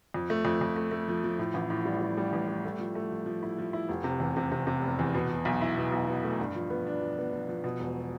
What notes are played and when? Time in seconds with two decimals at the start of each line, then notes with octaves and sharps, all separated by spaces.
0.14 F2
0.30 A3
0.45 F2
0.61 F2
0.76 A3
0.91 A3
1.08 F3
1.24 F3
1.39 A2
1.54 A1
1.70 A2
1.85 G3
2.01 G3
2.17 G3
2.33 A1
2.48 G3
2.65 A3
2.79 F3
2.95 A3
3.11 F3
3.26 F3
3.43 E4
3.58 F3
3.73 E4
3.89 F1
4.04 C3
4.20 E2
4.37 C3
4.52 C3
4.67 C3
4.82 F1
4.99 E2
5.14 B2
5.29 B2
5.45 B1
5.61 E4
5.77 B2
5.92 B1
6.07 B2
6.23 A3
6.40 G2
6.55 F3
6.70 B3
6.87 D4
7.01 F3
7.18 B3
7.33 F3
7.49 F3
7.64 B2
7.80 E1